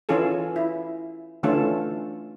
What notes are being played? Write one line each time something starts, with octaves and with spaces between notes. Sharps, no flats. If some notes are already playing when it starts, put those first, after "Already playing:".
E3 C#4 F4 G#4 A4
E4
D3 E3 A3 C#4 F4 A4